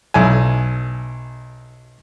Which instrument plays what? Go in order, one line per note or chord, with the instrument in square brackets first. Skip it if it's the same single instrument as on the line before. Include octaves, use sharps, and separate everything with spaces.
[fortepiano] B1 E4 G#5